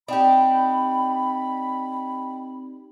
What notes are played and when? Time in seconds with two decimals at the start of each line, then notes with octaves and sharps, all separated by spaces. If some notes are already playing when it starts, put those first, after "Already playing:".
0.08 C4 D4 D#4 G4 D#5 G5 B5